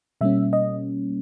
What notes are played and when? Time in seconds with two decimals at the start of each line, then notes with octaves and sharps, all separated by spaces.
0.21 B2 G3 A#3 C#4 E5
0.53 D#5